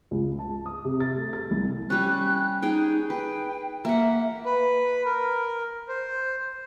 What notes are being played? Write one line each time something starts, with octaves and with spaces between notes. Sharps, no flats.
C#2
A5
D#6
C3
A6
A3
A6
C2
G3 C#4 F#6
D#4 G#4 G5
B4 G5
A#3 E5 F#5
B4
A#4
C5